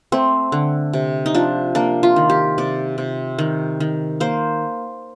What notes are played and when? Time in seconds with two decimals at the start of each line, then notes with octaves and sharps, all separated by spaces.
0.12 A3 C4
0.52 D3
0.93 C3
1.26 D#4
1.35 F3 D4
1.75 A#3 D4
2.03 F4
2.16 D#3
2.30 G4
2.58 C3 D5
2.98 C3
3.39 D#3
3.80 D#3
4.20 A#3 C5